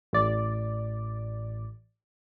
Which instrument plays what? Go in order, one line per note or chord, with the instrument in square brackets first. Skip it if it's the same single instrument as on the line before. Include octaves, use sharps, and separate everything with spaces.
[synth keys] A1 D5